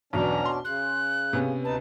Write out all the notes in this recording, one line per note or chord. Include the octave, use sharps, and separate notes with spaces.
B1 E2 B2 C#4 D4 A#5
C6
C#3 F#6
C3 B3 C#4
D2 D#4 B4 A5